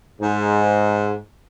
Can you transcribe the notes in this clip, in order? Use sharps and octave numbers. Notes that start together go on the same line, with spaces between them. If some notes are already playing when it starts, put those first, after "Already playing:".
G#2